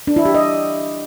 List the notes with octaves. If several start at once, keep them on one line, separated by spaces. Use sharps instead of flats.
D4
E4
G4
D#5